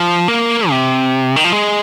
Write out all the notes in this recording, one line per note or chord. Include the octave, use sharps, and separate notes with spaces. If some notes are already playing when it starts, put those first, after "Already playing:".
Already playing: F3
A#3
C3
D#3
F3
G#3